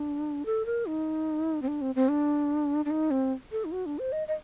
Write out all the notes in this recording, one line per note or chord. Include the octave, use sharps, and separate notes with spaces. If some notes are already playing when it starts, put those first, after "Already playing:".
Already playing: D4
A4
A#4
D#4
C4
D4
C4
C4
D4
D4
D#4
C4
A4
D#4
F#4
D4
C5
D#5
D#5